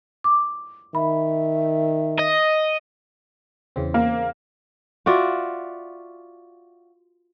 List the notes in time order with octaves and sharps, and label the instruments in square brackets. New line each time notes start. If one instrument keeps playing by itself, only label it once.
[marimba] D6
[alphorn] D#3 [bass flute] E5 [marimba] B5
[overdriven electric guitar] D#5
[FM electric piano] E2 C#3 C4
[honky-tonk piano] A#3 [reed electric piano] F5
[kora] F4 F#4 D5 E5